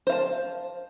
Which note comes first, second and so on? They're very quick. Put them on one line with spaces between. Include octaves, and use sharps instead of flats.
C5 F5 A5